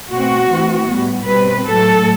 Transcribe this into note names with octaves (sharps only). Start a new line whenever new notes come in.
B2 A3 C4 F#4
E3 A3 C4
A2 G3 B3
B2 G3 C4 B4
A2 F#3 A3 A4